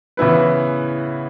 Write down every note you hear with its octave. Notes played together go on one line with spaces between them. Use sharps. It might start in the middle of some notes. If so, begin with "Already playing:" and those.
C#3 E3 B3 E4 B4